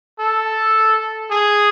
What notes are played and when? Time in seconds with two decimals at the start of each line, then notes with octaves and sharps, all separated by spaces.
0.19 A4
1.30 G#4